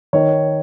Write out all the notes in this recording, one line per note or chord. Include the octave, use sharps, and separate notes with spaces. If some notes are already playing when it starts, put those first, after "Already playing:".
D#3 C#5